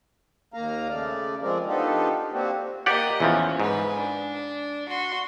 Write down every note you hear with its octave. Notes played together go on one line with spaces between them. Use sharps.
D#2 A#3 F5 A#5
C#3 A3 D5
F3 G#3 C4 A#4 D5
B3 D4 D#4 F4 G4 A4
A#3 C4 D4 F#4 G4
A#3 G4 D5 D#5 F#5
E2 E3 F3 C#4
G#2 B4 G#5
D4
F#4 C6